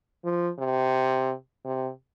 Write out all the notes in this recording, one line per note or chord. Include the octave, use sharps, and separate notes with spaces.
F3
C3
C3